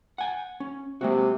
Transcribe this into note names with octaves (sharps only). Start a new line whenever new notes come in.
F#5 G#5
C#4
C3 G#3 A#3 F#4